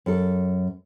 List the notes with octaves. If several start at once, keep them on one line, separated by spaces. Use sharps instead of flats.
F#2 A4